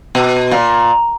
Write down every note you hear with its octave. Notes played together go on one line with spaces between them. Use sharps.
B2
A#2